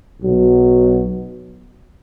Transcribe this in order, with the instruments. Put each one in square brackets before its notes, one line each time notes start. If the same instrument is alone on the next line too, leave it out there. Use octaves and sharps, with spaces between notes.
[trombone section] B1 B2 F#3